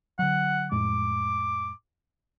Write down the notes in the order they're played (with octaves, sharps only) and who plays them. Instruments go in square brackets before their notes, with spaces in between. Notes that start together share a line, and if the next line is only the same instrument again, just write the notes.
[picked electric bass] D3 F#3 [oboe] F#5
[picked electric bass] F2 A2 G#3 [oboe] D6